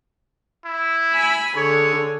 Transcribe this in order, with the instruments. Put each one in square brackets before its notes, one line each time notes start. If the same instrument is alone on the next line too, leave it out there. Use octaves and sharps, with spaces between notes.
[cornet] E4
[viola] G#5 B5
[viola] D3 G#4 [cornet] C#5